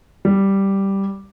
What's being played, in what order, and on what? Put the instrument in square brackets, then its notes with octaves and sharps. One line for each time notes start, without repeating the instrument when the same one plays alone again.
[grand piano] G3